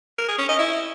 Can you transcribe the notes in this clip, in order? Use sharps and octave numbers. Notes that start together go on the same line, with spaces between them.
A#4
G#4
C#4
D#5
E4